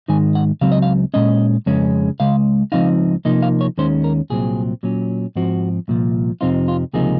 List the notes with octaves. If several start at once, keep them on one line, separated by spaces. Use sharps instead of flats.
G#2 D#3 G#3 D#4 G#5
F#5
C#2 C#3 F#3 C4 F5
D#5
F5
A#2 G#3 C#4 D#5
F2 C#3 G#3 C#4
C#2 C#3 G#3 F5
C#2 C#3 F3 C4 D#4 F5
C3 F3 A#3 D#4 D#5
F5
C#5
D#2 D#3 G#3 C#4 C5
A#4
C2 A#2 F#3 C4 G#4
A#2 F#3 C#4
G#2 F3 C4 F#4
C2 A#2 F3
F2 C3 F3 C4 D#4 F4
F4
C#2 C3 F3 A#3 D#4 G#4